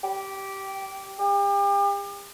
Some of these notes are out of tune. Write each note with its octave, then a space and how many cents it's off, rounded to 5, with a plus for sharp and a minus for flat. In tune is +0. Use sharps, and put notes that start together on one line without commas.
G4 -10
G4 +40